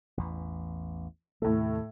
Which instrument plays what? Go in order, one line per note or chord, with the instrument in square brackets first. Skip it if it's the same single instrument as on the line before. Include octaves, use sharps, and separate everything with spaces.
[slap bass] A1 E2 E3
[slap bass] D#2 C3 A3 [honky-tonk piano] A2 A4